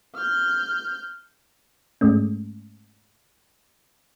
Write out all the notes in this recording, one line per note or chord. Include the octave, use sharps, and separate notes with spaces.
F6 G6
G#2 G#3 A3 C#4